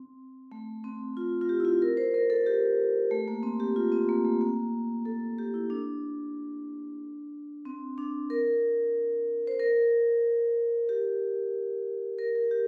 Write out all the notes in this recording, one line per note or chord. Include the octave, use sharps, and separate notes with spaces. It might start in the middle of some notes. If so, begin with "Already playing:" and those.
Already playing: C4
A3
C4
F4
F4
G4
E4
F4
A#4
C5
A#4
A4
G4
A3
A#3
C4
G4
F4
C4
A#3
A3
A#3
A4
G4
E4
D4
C4
D4
A#4
C5
A#4
G4
A#4
A#4
G4